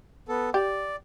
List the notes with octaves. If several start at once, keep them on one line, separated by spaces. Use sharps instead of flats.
B3 A4
G4 D5